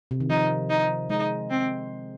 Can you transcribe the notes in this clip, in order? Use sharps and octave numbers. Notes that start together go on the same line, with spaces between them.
C3
D#3
F3 D#4
D#4
G#3 D#4
C4